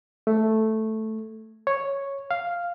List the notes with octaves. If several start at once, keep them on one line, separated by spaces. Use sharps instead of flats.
A3
C#5
F5